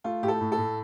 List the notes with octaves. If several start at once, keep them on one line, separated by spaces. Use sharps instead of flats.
A3 F4
A2 G4
A4
A2
A4
A2